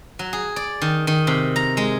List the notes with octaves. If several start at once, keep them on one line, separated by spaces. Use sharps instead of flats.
F#3
G#4
D5
D#3
D#3
C3
A#5
G#3